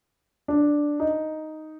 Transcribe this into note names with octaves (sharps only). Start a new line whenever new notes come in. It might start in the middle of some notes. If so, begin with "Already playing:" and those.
D4
D#4